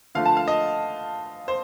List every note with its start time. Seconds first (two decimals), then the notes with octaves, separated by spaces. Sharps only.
0.15 D3 F3 A3 F5
0.26 A5
0.37 F5
0.48 D#5
1.48 C5